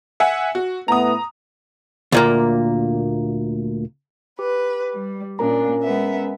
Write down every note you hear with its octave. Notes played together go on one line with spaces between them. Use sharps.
E5 F#5 G#5
F#4
A2 A3 B3 A#5 D#6
D2 A#2 A#3
G4 B4
G3
A#2 C#4 D4 A#4 A#5
G#3 B3 E5